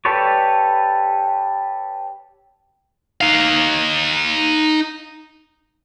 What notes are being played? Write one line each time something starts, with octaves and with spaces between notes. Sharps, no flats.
G4 A4 B4 C#5 D5
D#4 F5